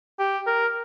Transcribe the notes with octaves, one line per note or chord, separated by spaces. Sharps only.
G4
A#4